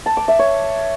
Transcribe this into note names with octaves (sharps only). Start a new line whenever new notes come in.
A5
D6
E5
C#5